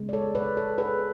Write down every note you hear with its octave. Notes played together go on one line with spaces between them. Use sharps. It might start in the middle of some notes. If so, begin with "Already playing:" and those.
Already playing: C#3 G#3 B3
D5
A4 C#5
B4 D5
A4 C#5
G#4 B4